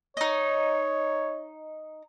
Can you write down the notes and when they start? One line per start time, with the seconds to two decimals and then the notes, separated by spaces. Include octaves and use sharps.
0.17 D#4 C#5 D#5